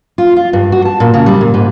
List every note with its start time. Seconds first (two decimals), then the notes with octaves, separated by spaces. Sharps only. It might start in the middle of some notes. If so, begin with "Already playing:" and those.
0.18 F4
0.36 F4
0.53 G2
0.72 F#4
0.85 A5
1.00 A#2
1.14 C#3
1.26 G3
1.41 A#2
1.54 G#2